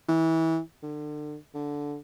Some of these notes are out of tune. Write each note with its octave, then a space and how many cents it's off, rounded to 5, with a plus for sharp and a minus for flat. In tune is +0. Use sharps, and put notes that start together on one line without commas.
E3 -25
D3 +30
D3 -10